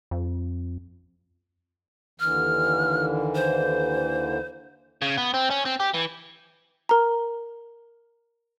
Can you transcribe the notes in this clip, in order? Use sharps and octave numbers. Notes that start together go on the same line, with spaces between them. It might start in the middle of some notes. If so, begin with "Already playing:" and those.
F2
D#2 D3 E3 F6
C5
C#3
B3
C4
C#4
C4
G4
E3
A#4 A#5